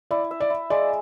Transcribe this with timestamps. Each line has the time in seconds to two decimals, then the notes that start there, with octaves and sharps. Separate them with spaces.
0.11 E4 D5
0.31 E5
0.40 D5
0.50 E4
0.70 G#3 D5